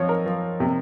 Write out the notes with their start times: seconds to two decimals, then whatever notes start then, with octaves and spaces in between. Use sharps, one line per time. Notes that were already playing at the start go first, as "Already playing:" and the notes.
Already playing: F3 C4 C#5 D#5
0.09 A#4
0.26 F3
0.60 C3